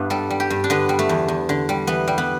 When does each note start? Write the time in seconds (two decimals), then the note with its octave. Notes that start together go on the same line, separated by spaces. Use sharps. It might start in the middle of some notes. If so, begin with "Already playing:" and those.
Already playing: G2 B3 D4 E4
0.10 G3 A4
0.30 G3
0.40 G4
0.50 G2
0.64 D4
0.70 D3 B3
0.89 G3
0.99 A3
1.09 E2
1.28 E2
1.49 D3
1.69 G3
1.87 E3 B3
2.08 G3
2.18 B3